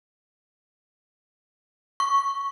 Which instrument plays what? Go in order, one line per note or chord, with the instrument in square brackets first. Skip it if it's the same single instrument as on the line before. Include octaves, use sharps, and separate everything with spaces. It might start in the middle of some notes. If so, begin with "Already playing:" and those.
[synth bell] C#6